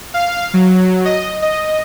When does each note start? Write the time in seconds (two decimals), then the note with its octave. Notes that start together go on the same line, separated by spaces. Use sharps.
0.14 F5
0.54 F#3
1.05 D#5
1.42 D#5